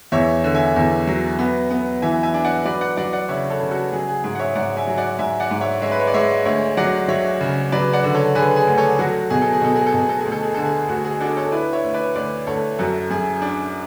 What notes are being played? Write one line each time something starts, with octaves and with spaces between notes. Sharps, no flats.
E2 C#5 E5
D3
E5 G#5
E2
F#3
B3
B3
E3 E5 G#5
E5 G#5
D4
D5 F#5
F#3 B4 D5
D5 F#5
F#3 D5 F#5
D5 F#5
C#3 C#5 E5
A4 C#5
C#3
F#4 A4
F#3 G#4
G#4
G#2 G#4
F#5
C#5 E5
G#2 D5 F#5
E5 G#5
F#3
D5 F#5
G#2 E5 G#5
D5 F#5
G#2
C#5 E5
G#3 C#5 E5
B4
C#5
D5
G#3 C#5 E5
D2 C#5 E5
F#3 D5 F#5
F#3 C#5 E5
C#3
F#3 B4 D5
D5 F#5
D3
A4 C#5
D3 G#4 B4
G#4
D2
A4 C#5
F#3 F#4 A4
B2 G#4
A4
G#4
B2 A4
G#4
A4
B2 G#4
A4
D2 G#4
A4
G#4
D3 A4
G#4
D2 F#4
G#4
D4 F#4 A4
A4 C#5
E4 B4 D5
C#5 E5
D2
B4 D5
D2 B4 D5
D2 A4 C#5
F#2 F#4 A4
F#2 G#4
D4